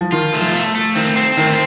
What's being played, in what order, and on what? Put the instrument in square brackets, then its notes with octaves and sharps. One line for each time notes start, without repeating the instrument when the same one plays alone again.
[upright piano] F3
[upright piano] D#3 [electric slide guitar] F4
[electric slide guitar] A3
[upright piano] F3
[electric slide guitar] A3
A3
[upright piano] D#3 [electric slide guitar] C4
[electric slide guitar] C4
[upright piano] D#3 [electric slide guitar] A3